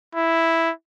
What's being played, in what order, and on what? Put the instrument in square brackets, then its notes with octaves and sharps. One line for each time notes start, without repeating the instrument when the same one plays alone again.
[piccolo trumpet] E4